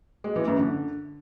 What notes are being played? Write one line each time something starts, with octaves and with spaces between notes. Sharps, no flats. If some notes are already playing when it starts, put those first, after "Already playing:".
G#3
E3
F#2
D3